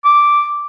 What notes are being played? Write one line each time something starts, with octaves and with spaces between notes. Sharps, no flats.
D6